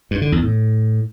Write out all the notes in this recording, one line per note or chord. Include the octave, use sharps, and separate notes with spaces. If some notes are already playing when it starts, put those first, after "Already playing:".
G2
D3
E2
A2